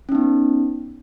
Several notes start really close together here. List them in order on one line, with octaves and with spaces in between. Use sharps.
C#4 D#4 B3